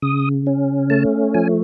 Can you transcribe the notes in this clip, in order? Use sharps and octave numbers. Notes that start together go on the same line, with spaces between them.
C#3 D#6
C#4
A3 A5
F3 G#5